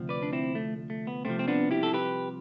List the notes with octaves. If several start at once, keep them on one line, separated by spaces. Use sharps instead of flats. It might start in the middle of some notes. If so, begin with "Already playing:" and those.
Already playing: D2 C3 F3
B4 D5
D4
C4 E4
A3
A3
B3
C2 C3 F3 A3 C4
C4
B3 D4
E4 G4
A4
G4 B4